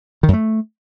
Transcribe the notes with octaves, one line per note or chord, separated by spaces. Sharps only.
D#3
F#2
A3